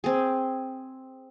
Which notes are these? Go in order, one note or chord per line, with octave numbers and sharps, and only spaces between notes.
C4 G#4